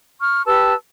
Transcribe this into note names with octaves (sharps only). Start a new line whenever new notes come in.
C#6 F6
G4 B4 A5 E6